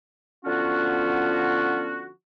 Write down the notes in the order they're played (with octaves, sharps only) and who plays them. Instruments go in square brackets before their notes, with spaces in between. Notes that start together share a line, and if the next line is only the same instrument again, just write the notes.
[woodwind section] D3 F3 B3 C#4 F#4